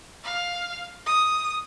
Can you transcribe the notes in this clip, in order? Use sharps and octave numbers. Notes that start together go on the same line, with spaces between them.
F5
D#6